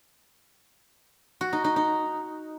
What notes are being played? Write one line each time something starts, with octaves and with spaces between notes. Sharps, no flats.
F#4
D#4
D#4
D#4